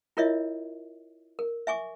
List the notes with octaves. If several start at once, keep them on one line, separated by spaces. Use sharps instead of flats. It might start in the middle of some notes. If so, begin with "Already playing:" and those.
E4 F4 A#4 C#5 D#5 E5
A#4
E5 G#5 C#6 D6